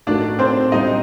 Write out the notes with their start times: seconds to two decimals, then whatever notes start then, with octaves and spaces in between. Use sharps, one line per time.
0.07 A2 A3 D4 D#4 F#4 A#4 D5
0.39 C4 C5
0.72 A#2 G3 D4 D#4 D#5